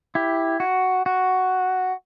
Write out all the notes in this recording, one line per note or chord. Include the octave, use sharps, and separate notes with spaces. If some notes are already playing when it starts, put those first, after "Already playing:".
E4 G4
F#4
F#4